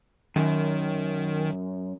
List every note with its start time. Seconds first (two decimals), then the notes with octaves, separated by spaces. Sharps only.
0.36 F#2 D#3